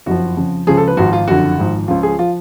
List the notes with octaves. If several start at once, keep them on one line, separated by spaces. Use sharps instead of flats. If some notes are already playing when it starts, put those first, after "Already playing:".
F#1 F2 F3 F#4
F2 C#3 F3
C#2 C#3 F3 G#4
A4
B4
G#1 G#2 F3 F#4
F4
F#1 F2 D3 F#4
G#1 G#2 F3
C#2 C#3 F3 F4
G#4
F3 F4